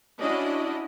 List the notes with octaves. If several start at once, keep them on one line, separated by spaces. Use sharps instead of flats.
C#4 D4 E4 F#4 D5 D#5